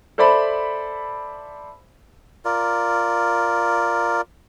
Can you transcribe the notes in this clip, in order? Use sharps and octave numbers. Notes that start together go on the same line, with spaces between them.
A4 C5 D5 E5 B5
F4 A#4 D5